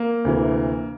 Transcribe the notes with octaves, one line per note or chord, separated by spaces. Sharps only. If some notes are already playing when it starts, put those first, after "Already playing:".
Already playing: A#3
D2 C3 E3